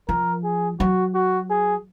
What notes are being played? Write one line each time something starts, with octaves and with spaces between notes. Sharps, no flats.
F3 A#4
G#4
F#3 F#4
F#4
G#4